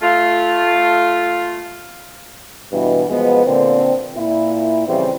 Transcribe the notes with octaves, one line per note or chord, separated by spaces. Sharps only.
A3 F4
G2 B2 E3
B2 F3 G#3 B3
A#2 D3 C4
A#2 E4
F2 C#3 E3 G3 C4 C#4